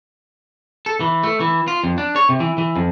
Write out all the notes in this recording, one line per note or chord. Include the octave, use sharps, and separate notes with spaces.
A4
E3
A3
E3
F4
F2
D4
C#5
C3
E3
E3
F2